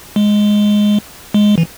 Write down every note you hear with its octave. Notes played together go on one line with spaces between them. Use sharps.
G#3
G#3
E3